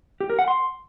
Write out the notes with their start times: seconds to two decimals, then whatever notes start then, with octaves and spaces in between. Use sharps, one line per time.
0.20 G4
0.30 A#4
0.39 F#5
0.48 C6